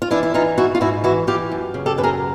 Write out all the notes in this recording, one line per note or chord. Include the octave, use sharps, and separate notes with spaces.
F4
E3 D4 E4
E4
E3 D#4 F4
G#2 E4 F#4
F4
G#2 E4 F#4
E3 E4 F#4
E3 F4 G4
F#2
C#3
G4 A4
F#2 B4
G#4 A#4